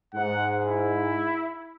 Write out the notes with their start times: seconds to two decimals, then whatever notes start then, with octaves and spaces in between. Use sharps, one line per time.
0.14 G#2 F#5
0.64 E4